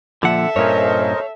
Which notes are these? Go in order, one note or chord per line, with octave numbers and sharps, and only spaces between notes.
A#2 D3 F3 A4 E5 F#5
G2 A#2 C#4 A#4 C5 C#5 D#5